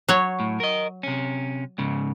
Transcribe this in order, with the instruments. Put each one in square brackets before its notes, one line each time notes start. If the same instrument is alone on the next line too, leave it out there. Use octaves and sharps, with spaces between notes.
[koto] F#3 C#5
[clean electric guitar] A2
A#4 D#5
C3 C#4
G#2 C#3